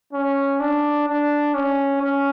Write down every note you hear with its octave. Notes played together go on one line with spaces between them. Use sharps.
C#4
D4
D4
C#4
C#4